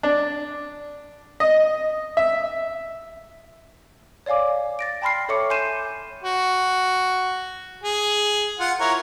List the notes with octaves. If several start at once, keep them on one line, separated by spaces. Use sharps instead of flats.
D4
D#5
E5
C#5 D5 F5 G#5 D6
A6 A#6 D7
G5 A5 B5 C6 F6 C7
A4 C#5 E5 C#6 D6 C#7
G#5 C6 G6 C7 D#7 E7
F#4
G#4
F4 F#5
E4 A#4 C#5